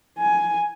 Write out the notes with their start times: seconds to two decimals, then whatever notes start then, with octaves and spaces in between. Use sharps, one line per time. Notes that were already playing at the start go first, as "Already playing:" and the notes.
0.19 G#5